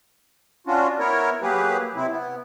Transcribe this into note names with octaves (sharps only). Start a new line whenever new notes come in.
C#4 D4 F4 F#4
B3 E4 A#4 C#5
F#3 A#3 G4 G#4 B4
C3 C4 E4
B3